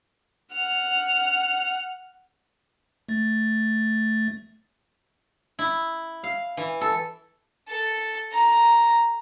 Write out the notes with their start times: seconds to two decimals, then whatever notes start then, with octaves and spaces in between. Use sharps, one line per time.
0.52 F#5 F6
3.08 A3 A6
5.59 E4
6.23 F5
6.57 E3
6.81 A4
7.69 A4
8.33 A#5